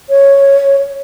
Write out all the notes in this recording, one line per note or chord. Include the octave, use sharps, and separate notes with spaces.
C#5